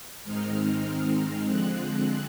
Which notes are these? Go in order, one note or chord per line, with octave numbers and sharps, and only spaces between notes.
G#2 D#3 G#3 C4 D#4 F6
D3 F3 G#3 C4 F#6